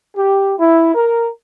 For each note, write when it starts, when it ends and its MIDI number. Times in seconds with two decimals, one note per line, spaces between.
0.15 0.53 67
0.59 0.93 64
0.95 1.29 70